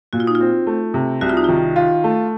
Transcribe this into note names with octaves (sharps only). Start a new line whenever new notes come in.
A#2 F#4
F4
D#4
F4
C4
A3
C3
C2 F#4
F4
D#4
D#3 F4
F4
A3